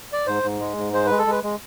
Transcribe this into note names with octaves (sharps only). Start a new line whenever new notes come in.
D5
G#2 C5
G#2
G#3
G#2
G#3 C5
G#3 B4
A4
G#3 B4
G#3